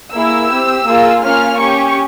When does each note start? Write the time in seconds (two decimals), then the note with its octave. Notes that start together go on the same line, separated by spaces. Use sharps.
0.13 A#3 E4 G#4 E6
0.50 C4 G4
0.86 A#3 F4 G#4
1.22 A#3 C#4 F4 F6
1.59 C#4 G4 C#6